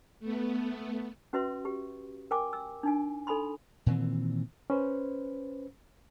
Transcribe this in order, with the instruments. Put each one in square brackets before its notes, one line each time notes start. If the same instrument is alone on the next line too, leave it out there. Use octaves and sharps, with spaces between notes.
[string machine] A3 B3
[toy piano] C#4 F#4 B4 E5 C6
G4
A#4 G5 G#5 D6
E6
D4 D#4 G#5
D#4 A4 G#5 B5 C6
[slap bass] A#2 D#3 E3 C4
[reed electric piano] C#4 B4 C5